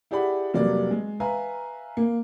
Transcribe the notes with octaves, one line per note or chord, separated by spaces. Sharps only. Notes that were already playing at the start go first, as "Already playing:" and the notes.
E4 G4 G#4 D5 F#5 B5
F1 F#3 G3 A#3 D5
G#3
B4 E5 F5 G#5 A#5
A#3